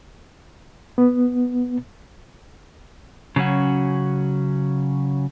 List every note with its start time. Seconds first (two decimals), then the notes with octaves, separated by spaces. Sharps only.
0.98 B3
3.36 C#3 F#3 C#4 F#4